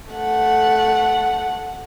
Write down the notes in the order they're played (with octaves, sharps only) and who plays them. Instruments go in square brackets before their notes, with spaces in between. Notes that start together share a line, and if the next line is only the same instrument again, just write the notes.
[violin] A3 F#5